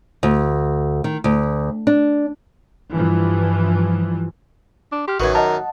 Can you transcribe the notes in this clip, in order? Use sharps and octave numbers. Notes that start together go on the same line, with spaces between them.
D2
D#3
D2
D4
G2 E3 F3
D4
G4 C6 F6
A1 F#2 D#3 F#4 B4 G#6
A#4 D#5 F#5 A5